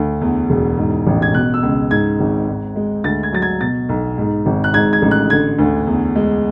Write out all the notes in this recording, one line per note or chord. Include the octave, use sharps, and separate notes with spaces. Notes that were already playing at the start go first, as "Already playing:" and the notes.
Already playing: D2
E2
E1
G#2
A1
G#6
B2 F#6
E6
C#2
G#2 G#6
G#1
G#2
G#3
D2 A6
G#6
F#3 A6
G#6
B2 A6
B1
G#2
G#1
F#6
G#2 G#6
G#6
A1
F#6
D3 G#6
D2
E2
G#3